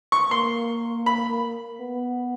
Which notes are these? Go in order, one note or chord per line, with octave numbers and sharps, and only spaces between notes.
C#6
A#3 C6
B5
B3